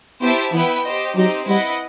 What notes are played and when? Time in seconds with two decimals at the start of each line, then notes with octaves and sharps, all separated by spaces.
0.22 B3 E4 G4 C5 E5 A5
0.53 E3 B3 E4 B4 E5 G5
0.84 G4 C5 D#5
1.16 F#3 C4 D#4 G4 D#5
1.47 G3 E4 B4 D#5 F#5